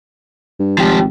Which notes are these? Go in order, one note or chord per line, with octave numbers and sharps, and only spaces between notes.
G2
G#1 F3 G4